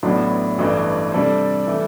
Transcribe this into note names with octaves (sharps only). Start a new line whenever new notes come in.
A1 A2 F#3 B3 D4
A1 G2 E3 A3 D4
C3 G3 D4 A4 C5
E3 A3